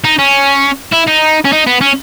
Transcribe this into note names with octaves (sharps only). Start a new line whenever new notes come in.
D#4
C#4
E4
D#4
C#4
D#4
B3
C#4